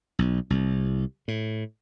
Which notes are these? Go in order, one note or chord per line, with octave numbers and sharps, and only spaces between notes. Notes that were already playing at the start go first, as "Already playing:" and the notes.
B1
C2
A2